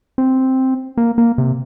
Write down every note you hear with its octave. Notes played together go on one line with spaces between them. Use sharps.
C4
A#3
A#3
C3